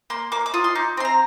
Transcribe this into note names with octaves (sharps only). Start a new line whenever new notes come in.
A#3 C6
A#3 D6
D6
F4 D#6
C6
D#4 D6
C4 C6
A#5